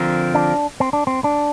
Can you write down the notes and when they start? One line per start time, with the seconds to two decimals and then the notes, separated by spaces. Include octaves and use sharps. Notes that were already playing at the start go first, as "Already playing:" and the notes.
Already playing: D3 F3 C4 F4 A#4
0.34 D4
0.80 C4
0.93 D4
1.07 C4
1.24 D4